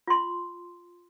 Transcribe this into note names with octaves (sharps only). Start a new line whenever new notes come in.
F4 C6